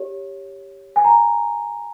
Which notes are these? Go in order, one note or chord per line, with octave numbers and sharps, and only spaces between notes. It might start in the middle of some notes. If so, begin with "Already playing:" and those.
Already playing: G4 C#5
G#5
A#5